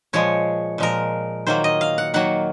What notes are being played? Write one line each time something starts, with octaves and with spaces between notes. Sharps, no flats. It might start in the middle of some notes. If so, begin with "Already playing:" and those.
A#2 F3 G#3 C#5
A#2 F3 G#3 A#4
D#3 F#3 A#3 C5
D#5
F5
F#5
D#3 F#3 A#3 F#5